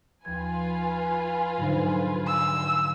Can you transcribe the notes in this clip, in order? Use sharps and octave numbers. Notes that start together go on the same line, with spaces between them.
D#2 F3 F4 B4 G#5 G#6
G#2 D3 F#3 D#4
E6